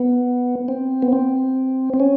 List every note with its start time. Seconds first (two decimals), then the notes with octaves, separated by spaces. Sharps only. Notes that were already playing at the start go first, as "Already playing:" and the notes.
Already playing: B3
0.68 C4
1.02 B3
1.13 C4
1.94 C4
2.00 C#4